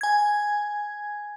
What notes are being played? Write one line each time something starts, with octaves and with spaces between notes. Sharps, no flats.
G#5 G#6